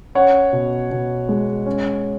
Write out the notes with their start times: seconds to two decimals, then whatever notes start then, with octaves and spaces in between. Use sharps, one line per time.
0.15 C#4 C#5 F#5
0.53 B2
0.91 B2
1.29 G#3
1.66 C#4